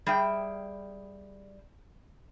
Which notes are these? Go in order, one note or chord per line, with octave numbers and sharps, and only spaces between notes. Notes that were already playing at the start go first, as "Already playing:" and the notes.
G3 G#4 E5 G5